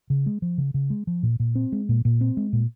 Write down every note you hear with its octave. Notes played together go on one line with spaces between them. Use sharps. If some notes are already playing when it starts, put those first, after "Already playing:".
C#3
G#3
F3
C#3
C#3
G#3
F3
A#2
A#2
C4
G#3
A#2
A#2
C4
G#3
A#2